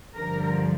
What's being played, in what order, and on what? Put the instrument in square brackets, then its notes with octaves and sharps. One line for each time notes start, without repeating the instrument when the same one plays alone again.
[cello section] G2 D3 F3 A#4